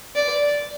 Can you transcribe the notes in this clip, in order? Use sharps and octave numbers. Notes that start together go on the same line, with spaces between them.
D5